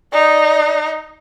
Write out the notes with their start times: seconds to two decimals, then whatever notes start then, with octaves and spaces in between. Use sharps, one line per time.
0.12 D#4 D5